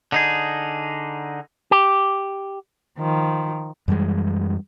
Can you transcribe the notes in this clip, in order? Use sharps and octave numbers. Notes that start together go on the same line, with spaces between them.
D3 D#4 G#4
G4
D#3 F3
F#2 E3 G3 G#3